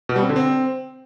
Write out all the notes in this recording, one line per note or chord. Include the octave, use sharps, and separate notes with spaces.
B2
G3
C4
D3
C4